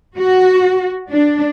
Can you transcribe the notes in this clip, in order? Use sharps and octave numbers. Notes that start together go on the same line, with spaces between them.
F#4
D4